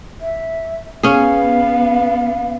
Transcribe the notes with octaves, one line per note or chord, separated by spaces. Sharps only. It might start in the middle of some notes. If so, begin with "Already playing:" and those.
E5
B3 C#4 G#4 F5